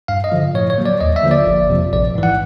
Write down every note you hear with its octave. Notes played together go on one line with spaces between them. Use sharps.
G2 F5
D#5
D3 F3
A2 C#5
C#5
F#3 A#3
D5
D#2 D#5
E5
D3 F3 A#3
D5
G1
F2 C3 F3
A#1 D5
G#2 E3
F#5